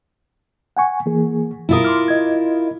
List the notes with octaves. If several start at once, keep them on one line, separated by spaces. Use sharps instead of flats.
F#5 G#5 C#6
E3 A#3 G#4
B2 E4 F4 A#4 D#6
C6 D6 F6
D#5 G#6